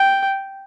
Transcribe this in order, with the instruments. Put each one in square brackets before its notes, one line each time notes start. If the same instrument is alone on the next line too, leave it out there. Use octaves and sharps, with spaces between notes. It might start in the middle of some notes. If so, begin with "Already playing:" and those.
Already playing: [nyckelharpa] G5